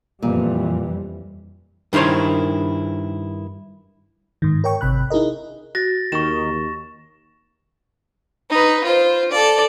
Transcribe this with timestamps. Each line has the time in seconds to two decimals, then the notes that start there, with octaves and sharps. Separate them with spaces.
0.22 F2 A#2 E3 G3
1.93 G2 D#3 E4 C5 C#5
4.42 G#2 D#3
4.64 A#4 C#5 G5 C#6
4.81 G#1 C3 B5 F#6
5.10 D#4 E4 G#4 A#4 D#5
5.75 F#4 A6 A#6
6.12 D#2 D#3 C#6 E7
8.50 D#4 B4
8.84 F4 C5
9.31 A4 D5